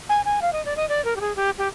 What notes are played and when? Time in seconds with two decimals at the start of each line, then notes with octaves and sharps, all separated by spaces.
0.09 G#5
0.25 G#5
0.42 F5
0.53 D#5
0.65 D5
0.77 D#5
0.89 D5
1.05 A#4
1.16 G4
1.21 G#4
1.36 G4
1.58 G4